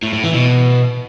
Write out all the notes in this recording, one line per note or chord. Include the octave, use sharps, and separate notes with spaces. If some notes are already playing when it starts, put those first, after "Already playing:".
A2
A2
E3
B2